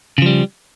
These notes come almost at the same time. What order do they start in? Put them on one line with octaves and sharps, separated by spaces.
C#3 F3 G3